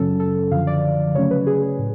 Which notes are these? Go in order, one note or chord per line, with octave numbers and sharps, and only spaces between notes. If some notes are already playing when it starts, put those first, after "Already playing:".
Already playing: F#2 C#3 F#3 C#4 A4
A4
F#2 D3 F3 F5
D5
C#3 F#3 A3 C#4 C#5
B4
G#4
A2